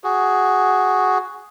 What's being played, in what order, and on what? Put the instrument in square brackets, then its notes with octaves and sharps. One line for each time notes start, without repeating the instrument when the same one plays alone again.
[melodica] F#4 G#4